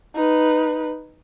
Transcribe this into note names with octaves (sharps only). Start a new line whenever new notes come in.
D#4 B4